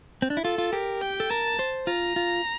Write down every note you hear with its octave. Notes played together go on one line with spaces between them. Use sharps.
C4
D4
E4
F4 A4
F4
G4 A#4
G5
A4
A#4 A5
C5
F4 A#5
F4